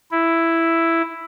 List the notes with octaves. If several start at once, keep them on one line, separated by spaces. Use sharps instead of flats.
E4